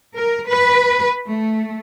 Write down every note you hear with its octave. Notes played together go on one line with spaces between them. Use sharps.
A#4
B4
A3